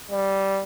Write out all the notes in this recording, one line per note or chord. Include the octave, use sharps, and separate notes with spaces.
G3